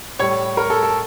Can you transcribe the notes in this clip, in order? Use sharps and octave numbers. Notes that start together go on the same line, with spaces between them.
A2 G3 C#5
A#4
A4
A4